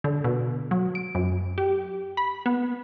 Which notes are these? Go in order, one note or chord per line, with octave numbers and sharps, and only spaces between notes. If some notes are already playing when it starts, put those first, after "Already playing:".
D3
B2
F#3
D7
F#2
G4
B5
B3